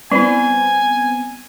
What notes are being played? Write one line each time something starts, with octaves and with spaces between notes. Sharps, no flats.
G3 B3 C4 E4 G#5